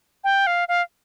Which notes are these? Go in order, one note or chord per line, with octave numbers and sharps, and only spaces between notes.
G5
F5
F5